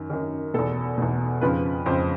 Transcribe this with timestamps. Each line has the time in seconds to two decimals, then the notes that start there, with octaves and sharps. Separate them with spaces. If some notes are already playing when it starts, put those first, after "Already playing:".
Already playing: F#2 D#3
0.10 F#2 D#3
0.54 E2 B2 A4
0.98 E2 B2
1.41 F2 C#3 F3 B4
1.86 F2 C#3 F3 C5